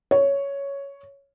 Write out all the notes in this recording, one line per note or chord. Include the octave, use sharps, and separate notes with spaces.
C#5